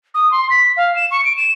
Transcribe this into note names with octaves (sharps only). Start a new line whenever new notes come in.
D#6
C6
B6
F5
E7
C#6
D7
E7